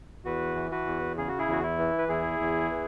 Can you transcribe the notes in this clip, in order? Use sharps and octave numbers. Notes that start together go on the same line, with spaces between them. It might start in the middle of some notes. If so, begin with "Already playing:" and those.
E2 F#4 B4
E3
F#4 B4
E2
C#3 G#4
F#4
E4 G#4
E2 F#4
E4
E3
B4
E2 E4 G#4
E2
E3